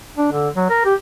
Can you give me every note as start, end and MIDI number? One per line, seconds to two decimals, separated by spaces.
0.17 0.29 62
0.32 0.49 50
0.56 0.67 54
0.70 0.83 70
0.85 0.95 67